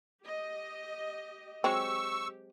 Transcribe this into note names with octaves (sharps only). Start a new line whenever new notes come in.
G4 D#5
F#3 G#3 C4 G4 C#6 E6